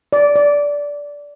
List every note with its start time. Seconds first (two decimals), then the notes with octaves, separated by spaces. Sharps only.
0.13 D5
0.36 D5